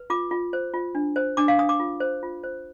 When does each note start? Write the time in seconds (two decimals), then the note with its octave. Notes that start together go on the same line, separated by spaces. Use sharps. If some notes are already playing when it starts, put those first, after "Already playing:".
Already playing: B4
0.10 F4 D6
0.31 F4
0.53 C5
0.74 F4
0.95 D4
1.16 C5
1.37 D4 D6
1.48 F5
1.58 D4 D#6
1.69 D6
1.80 F4
2.00 C5
2.23 F4
2.44 C5